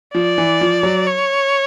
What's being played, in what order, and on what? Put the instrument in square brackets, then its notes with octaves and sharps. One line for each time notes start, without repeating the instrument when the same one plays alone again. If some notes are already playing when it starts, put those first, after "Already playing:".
[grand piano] F3 [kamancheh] D5
[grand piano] E3
F3
F#3
[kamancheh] C#5